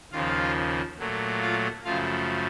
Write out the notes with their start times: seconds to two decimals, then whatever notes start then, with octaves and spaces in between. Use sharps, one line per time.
0.12 D#2 C#3 F3 F4 F5
0.99 A#2 F#3 A3
1.42 F4 F5
1.85 F#2 C#3 F3 A3 F4 F5